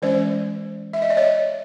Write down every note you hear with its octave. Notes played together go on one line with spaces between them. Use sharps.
E3 G#3 C#4 C5 D5
E5
D#5
D5
C#5 D#5